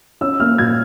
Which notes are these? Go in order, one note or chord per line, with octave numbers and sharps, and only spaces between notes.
C#4 E6
A#3 F6
A#2 G#6